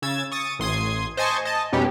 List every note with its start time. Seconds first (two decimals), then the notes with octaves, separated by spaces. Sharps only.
0.02 C#3 E6 G#6 A6
0.32 C#6 D#6 A6
0.59 A1 C6 D#6 G#6
1.17 C5 D#5 G#5 A5 C#6
1.45 D#5 A5
1.73 F2 B2 G3 C#4 D#4 G4